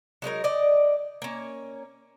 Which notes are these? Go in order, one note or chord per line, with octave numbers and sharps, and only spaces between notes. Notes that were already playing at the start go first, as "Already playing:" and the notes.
F#3 G#3 D#4 A#4
D5 D#5
A#3 C#4